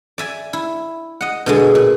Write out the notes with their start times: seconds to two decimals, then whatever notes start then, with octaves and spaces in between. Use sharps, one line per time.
0.18 D5 E5 G#5
0.53 E4
1.21 D#5 F#5
1.46 B2 D3 G#3
1.75 A#2